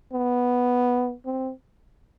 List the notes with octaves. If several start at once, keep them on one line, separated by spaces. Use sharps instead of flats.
B3
C4